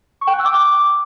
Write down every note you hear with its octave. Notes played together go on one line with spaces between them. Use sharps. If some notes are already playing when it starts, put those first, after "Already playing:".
C#6
G5
F#6
E6
D6